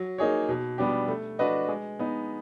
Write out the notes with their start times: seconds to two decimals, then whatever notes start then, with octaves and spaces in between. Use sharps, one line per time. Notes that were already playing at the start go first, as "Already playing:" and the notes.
Already playing: F#3
0.18 A#3 D#4 G#4 C#5
0.49 B2
0.78 G3 B3 D4 G4
1.08 A3
1.39 D4 F#4 B4 D#5
1.69 G#3
1.99 B3 D#4